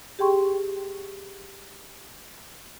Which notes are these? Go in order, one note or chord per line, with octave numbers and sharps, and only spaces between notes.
G4 G#4 G5 C6 C#6